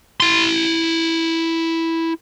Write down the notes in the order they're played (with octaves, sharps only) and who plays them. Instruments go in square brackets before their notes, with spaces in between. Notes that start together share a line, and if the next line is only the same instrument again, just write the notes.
[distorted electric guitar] E4 C6